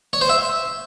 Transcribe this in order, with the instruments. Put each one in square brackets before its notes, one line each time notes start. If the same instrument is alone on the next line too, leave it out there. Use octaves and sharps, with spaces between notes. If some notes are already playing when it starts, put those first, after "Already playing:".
[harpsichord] C#5
C5
E5